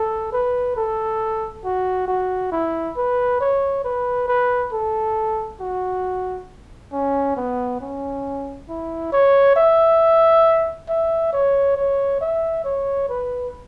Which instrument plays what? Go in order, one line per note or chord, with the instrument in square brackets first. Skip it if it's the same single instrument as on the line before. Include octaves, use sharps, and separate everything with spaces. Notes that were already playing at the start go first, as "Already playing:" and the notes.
Already playing: [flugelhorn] A4
B4
A4
F#4
F#4
E4
B4
C#5
B4
B4
A4
F#4
C#4
B3
C#4
E4
C#5
E5
E5
C#5
C#5
E5
C#5
B4